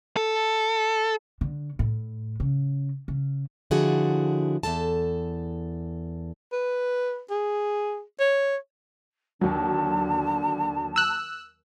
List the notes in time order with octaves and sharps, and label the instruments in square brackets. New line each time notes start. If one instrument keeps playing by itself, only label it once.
[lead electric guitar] A4
[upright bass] D3
A2
C#3
C#3
[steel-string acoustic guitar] D3 F3 E4 F#4 G#4
E2 A#2 A4 A5
[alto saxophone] B4
G#4
C#5
[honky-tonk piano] D#2 F#3 [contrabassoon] D3 [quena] A5
[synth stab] E6 F#6